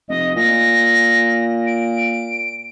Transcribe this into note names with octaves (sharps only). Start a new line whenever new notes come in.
F1 D#5
A#2 A#6
D7